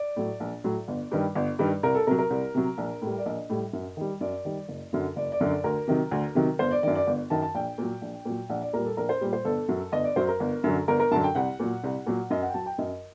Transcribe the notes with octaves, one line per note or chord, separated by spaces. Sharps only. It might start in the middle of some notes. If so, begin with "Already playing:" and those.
Already playing: D5
A2 F#3
A#1
A2 F#3
G1
G2 D#3 G3
G1
G2 D#3 G3
C2 A#4
A4
C3 F#3 A#4
A#4
C2
C3 F#3
A#1
A2 G3
D5
A#1 D#5
A2 G3
F#2
D#3 G3
F#2 D5
D#3 G3
F#1
F#2 D3 F#3
F#1 D5
D5
F#2 D3 F#3
D5
D2 A#4
C3 D#3 F#3
D2
C3 D#3 F#3
G1 C5
D5
F#2 D#3 D5
D5
G1
F#2 D#3 A5
A5
A#1 G5
A#2 F#3
A#1
A#2 F#3
A#1 F#5
D5
A#2 G3 A#4
A4
A#1 A#4
C5
A#2 G3
C5
G1 A4
F#2 F#3
G1 D#5
D5
F#2 F#3 C5
A#4
G1
F#2 D3 F#3
G1 A#4
A#4
F#2 D3 F#3 A5
G5
C2 F#5
A#2 F#3
C2
A#2 F#3
F#2 D#5
F#5
G5
F#3 A5
G5
F#2 D#5